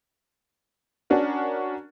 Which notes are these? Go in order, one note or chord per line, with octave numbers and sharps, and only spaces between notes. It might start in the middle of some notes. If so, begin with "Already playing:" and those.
C#4 D4 F#4 A#4